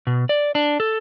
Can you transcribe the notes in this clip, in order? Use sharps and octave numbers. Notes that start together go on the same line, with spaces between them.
B2
D5
D4
A4